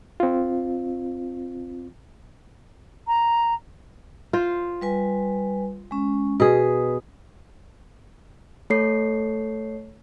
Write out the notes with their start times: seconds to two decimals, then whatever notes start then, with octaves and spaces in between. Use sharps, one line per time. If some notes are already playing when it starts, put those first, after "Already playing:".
0.20 C4 F4
3.08 A#5
4.33 F4 C5
4.81 G3 B4 G#5
5.91 G#3 C#4
6.40 B2 G#4 B4
8.70 A3 A4 C#5 C7